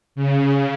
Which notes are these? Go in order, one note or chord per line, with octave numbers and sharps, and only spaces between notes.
C#3